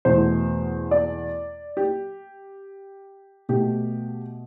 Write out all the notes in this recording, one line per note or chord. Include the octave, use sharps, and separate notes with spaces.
E2 B2 A3 C5
D5
G4
B2 A3 G4